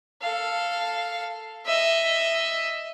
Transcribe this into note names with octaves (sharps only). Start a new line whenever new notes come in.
A4 F5
D#5 E5